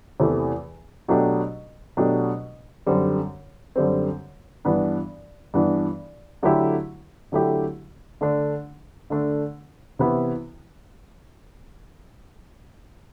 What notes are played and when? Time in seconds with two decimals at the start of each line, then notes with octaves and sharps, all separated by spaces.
0.20 E2 C3 E3 A3
1.08 B2 F#3 A3 D4 G4
1.97 B2 F#3 A3 D4 G4
2.87 F#2 D3 G3 C4
3.76 F#2 D3 G3 C4
4.65 G2 E3 B3 D4
5.54 G2 E3 B3 D4
6.43 D3 F#3 A3 E4 G4
7.32 D3 F#3 A3 E4 G4
8.21 D3 A3 D4
9.10 D3 A3 D4
9.99 C3 E3 B3 E4